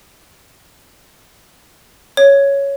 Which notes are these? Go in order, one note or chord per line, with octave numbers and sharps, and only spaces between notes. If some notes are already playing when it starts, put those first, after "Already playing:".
C#5